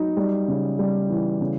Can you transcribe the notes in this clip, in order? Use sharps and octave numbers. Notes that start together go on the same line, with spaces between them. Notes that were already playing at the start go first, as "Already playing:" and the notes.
Already playing: F#3 D#4
G3
C#3
G3
E3
C#3